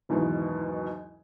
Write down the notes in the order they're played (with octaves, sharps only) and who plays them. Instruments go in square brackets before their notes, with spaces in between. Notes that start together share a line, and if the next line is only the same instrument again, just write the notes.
[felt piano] F#1 E2 G#2 B2 D#3 E3